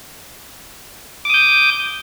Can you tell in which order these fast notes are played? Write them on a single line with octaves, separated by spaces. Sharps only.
D6 D#6 G6